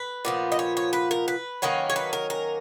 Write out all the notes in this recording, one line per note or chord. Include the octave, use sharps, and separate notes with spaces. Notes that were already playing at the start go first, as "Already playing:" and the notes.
Already playing: B4
A#2 F3 B3
D#5
C#5
C#5
B4
A#4
B4
D#3 F#3 A#3 C#4
C#5
B4
A#4
A#4